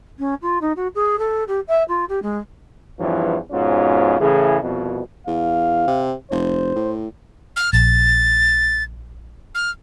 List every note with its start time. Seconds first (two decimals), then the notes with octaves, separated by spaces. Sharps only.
0.19 C#4
0.42 F4
0.61 D#4
0.76 F#4
0.95 G#4
1.19 A4
1.48 G4
1.68 E5
1.89 F4
2.09 G4
2.22 G#3
2.99 E2 G2 E3 F3 C#4
3.51 F2 G#2 B2 C#4 F4
4.20 A2 C#3 E3 G#4
4.62 C2 F2 B2
5.27 E2 F5
5.87 C3
6.31 F1 C5
6.76 A2
7.56 F6
7.73 A#1 A6
9.55 F6